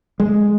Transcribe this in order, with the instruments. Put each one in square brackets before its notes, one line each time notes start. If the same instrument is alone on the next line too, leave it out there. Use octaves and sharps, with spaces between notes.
[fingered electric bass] G#3